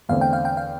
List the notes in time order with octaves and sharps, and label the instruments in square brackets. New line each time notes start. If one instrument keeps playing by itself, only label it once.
[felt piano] E2 D3 A3 C4 [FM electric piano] F5
[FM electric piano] G5
F5
G5
F5